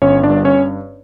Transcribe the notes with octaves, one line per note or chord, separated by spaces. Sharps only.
G1 C#4 C#5
D4 D5
G2
C#4 C#5